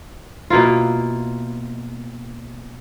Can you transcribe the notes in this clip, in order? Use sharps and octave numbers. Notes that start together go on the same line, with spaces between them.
B2 A#3 E4 F4